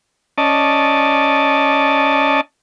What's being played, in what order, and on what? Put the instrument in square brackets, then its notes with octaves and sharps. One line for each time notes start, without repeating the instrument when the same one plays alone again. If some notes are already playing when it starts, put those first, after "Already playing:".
[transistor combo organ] C#4 D5 D#5 A5